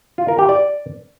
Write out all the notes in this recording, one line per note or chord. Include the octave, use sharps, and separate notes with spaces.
F4
A#4
G4
D5